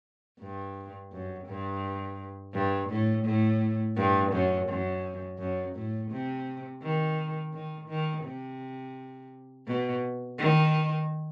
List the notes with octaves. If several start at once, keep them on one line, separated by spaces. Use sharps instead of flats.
G2
F#2
G2
G2
A2
A2
G2
F#2
F#2
F#2
A2
C3
D#3
D#3
D#3
C3
B2
D#3